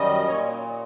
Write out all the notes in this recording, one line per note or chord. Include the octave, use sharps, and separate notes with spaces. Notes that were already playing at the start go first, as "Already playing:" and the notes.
Already playing: F#2 D#3 G3 D#5
A#2 C#5